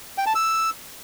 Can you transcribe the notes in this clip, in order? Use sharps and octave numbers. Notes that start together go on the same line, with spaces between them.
G5
A5
E6